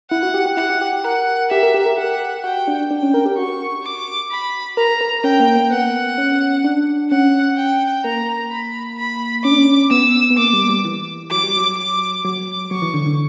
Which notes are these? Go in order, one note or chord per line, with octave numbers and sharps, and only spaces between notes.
E4 F#5
F#4
G4
G4
E4 F#5
G4
G4
G4
A#4 F#5
G4 E5
A#4
G4
A#4
G4 F#5
F#4 G5
D4
D4 G5
C#4
A#4
G4
F#4 C#6
D6
B5
A#4 A#5
A#4
C#4 G5
A#3
A#3
B3 F#5
C#4
D4
C#4 F#5
G5
A#3 A#5
B5
B5
C#4 D6
D4
C#4
B3 E6
B3
A#3 D6
G3
G3
E3
F#3 D6
G3
F#3
D6
F#3 D6
F#3 C#6
E3
D3
D3